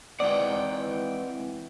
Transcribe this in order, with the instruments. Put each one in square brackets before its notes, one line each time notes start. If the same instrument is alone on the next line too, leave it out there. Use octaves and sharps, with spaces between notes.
[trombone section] E3 [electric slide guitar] G#3 C4 D#5 [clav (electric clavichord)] D5 [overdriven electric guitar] F#5 G5